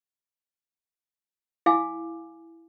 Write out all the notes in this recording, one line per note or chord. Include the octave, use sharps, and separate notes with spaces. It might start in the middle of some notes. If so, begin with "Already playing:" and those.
E4 F5 G#5 D6